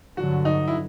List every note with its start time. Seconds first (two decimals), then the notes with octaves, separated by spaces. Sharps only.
0.17 G2 D3 F#3 F#4
0.45 D#4
0.68 E4